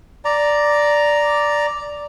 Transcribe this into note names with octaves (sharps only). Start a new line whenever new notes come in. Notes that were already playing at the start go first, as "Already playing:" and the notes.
D5 A#5